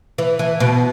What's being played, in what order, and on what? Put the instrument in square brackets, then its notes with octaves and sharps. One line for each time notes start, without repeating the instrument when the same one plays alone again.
[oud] E3
E3
B2